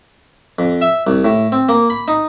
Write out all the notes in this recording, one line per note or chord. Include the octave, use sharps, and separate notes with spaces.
F2
E5
C2
A2
C4
A#3
B5
D#4